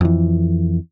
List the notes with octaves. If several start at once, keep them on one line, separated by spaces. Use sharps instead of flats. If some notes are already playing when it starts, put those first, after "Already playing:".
F2 E3